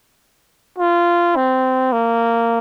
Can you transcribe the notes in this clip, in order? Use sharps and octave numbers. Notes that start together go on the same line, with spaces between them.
F4
C4
A#3